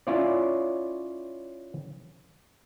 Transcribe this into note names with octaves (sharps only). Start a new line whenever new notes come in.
C#4 E4 F4 C#5 D5